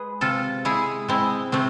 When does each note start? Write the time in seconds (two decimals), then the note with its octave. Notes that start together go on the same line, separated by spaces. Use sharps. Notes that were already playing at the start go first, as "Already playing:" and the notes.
Already playing: G#3 G#4 B4
0.21 C3 F4 A4
0.65 G#3 E4 G#4
1.08 G#3 C4 E4
1.52 C3 A3 C4